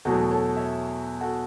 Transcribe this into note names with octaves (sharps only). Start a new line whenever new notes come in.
E2 B2 F#3 A3 F#4 A4
A4 C#5
C#5 E5
F#4 A4